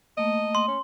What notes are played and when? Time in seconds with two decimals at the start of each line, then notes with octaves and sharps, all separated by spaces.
0.17 A3 A#3 D#5
0.55 C6
0.68 C#4